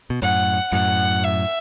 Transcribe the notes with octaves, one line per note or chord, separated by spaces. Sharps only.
B2
F#2 A2 F#5
F#2 A2 F#5
E5